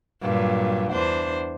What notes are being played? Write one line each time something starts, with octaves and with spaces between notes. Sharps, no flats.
G2 A#2 F#3
E2 D4 C5